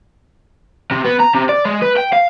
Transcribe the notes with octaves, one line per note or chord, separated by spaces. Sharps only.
C3
B3
A#5
C3
D5
G#3
B4
G5
F5